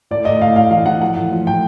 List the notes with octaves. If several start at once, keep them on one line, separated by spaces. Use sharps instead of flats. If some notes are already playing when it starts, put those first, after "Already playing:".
A2 D5
A2 D#5
A2 F5
A2 F5
E3 F5
E3 F#5
F3 F#5
A2
F3
A2 G5